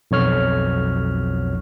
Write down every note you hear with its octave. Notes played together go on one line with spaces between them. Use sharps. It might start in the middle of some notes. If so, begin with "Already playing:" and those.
B1 F2 C#5 F6